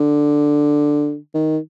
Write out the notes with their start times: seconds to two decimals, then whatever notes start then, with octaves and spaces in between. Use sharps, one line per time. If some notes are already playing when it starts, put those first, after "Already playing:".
Already playing: D3
1.34 D#3